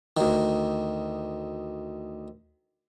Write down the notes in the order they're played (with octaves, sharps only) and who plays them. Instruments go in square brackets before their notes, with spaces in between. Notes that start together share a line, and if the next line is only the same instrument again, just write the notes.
[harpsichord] D2 D#3